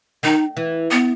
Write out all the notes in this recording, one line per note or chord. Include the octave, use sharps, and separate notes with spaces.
D#3 D#4
E3
B3